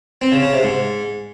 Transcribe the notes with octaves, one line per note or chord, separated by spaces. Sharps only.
C4
C#3
C#3
C3
G#2